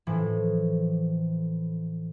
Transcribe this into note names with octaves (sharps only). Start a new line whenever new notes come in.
A2 E3 F3